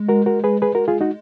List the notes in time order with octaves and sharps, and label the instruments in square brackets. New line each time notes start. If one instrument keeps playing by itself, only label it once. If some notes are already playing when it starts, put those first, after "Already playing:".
Already playing: [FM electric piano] G#3
[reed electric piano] F#4 A#4
F#4 A#4
G#4 B4
G#4 B4
F#4 A#4
F4 G#4
D#4 F#4